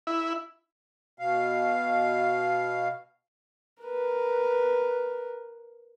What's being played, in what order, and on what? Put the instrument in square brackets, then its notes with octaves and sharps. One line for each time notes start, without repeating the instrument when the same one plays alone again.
[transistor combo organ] E4
[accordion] B2 F5
[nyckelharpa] A#4 B4